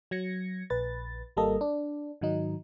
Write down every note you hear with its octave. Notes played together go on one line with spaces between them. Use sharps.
F#3 G#6 A#6 C#7
A#1 B4 A6
G#1 G3 A#3 A4 D#5
D4
G#2 D#3 F#3 D#4